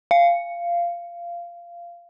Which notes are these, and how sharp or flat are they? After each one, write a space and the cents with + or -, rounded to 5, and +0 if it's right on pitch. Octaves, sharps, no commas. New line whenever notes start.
F5 -15